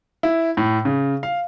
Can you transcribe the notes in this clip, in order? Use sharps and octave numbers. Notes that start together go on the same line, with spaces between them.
E4
A2
C#3
F5